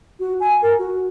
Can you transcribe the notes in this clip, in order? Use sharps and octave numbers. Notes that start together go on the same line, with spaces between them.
F#4
G#5
A#4
F#4